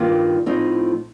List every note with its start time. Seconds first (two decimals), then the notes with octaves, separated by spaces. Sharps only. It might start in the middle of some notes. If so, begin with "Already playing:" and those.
Already playing: G2 D#3 G3 A#3 F4
0.46 A2 F3 C4 D#4